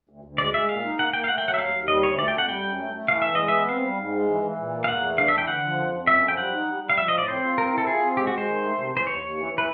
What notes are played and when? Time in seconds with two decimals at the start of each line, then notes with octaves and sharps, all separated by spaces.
0.09 D2
0.24 D2
0.38 G#3 D5
0.54 G#3 E5
0.69 A#2 F5
0.84 D#4
0.99 A#3 F#5
1.13 A#3 G5
1.24 F5
1.28 A3 F#5
1.38 G5
1.43 F#3 F#5
1.54 E5
1.59 D#2 F5
1.74 D#2
1.88 G3 D#5
2.03 D2 C#5
2.18 A3 D5
2.28 G5
2.34 F2 F#5
2.48 G3 G5
2.63 F#2
2.78 A3
2.94 A3
3.08 E3 F5
3.22 E2 E5
3.35 G#3 D#5
3.48 B3 E5
3.69 C4 F5
3.83 G3
3.98 G#2
4.14 G#3
4.29 E3
4.43 E3
4.58 A#2
4.73 A#3
4.84 F5
4.88 E2 F#5
5.03 A3
5.17 D4 F5
5.28 E5
5.33 E3 G5
5.47 D3 F#5
5.64 F3
5.77 F2
5.93 F2
6.07 F#2 E5
6.23 F3
6.28 G5
6.37 G3 F#5
6.53 D#4
6.68 G3
6.82 G3
6.90 F5
6.98 F3 E5
7.08 D#5
7.12 A2
7.18 D5
7.28 C4 C5
7.43 F4
7.58 C4 A#4
7.72 E4
7.78 A4
7.87 F4 G#4
8.02 C4
8.17 G#3 G4
8.27 F#4
8.33 G#3 C5
8.47 D#3
8.63 A3
8.78 C3
8.92 E3 C5
9.07 D#2 C#5
9.22 D#2
9.38 E3
9.52 E3
9.58 B4